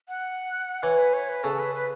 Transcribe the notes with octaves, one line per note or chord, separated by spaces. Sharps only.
F#5
E3 C#5
B4
C#5
B4
C#3 A4
B4
B4